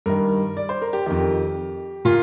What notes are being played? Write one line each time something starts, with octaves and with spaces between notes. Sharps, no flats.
G2 D#3 A#4
D5
C5
A#4
G4
F2 D#3 G4
A#2 F4